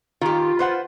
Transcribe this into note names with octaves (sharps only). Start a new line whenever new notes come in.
D#3 F4 G4
B4 C5 F#5